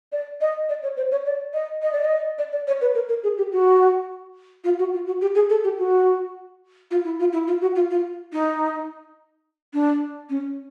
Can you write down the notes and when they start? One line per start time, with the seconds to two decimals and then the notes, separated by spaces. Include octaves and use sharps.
0.12 D5
0.41 D#5
0.69 D5
0.83 C#5
0.97 C5
1.11 C#5
1.25 D5
1.53 D#5
1.82 D#5
1.92 D5
2.04 D#5
2.38 D5
2.52 D5
2.67 C#5
2.81 B4
2.94 A#4
3.09 A#4
3.23 G#4
3.37 G4
3.52 F#4
4.64 F4
4.79 F#4
4.93 F4
5.06 F#4
5.21 G4
5.35 G#4
5.50 A4
5.64 G4
5.78 F#4
6.91 F4
7.04 E4
7.19 F4
7.32 E4
7.47 F4
7.61 F#4
7.75 F4
7.90 F4
8.33 D#4
9.73 D4
10.30 C#4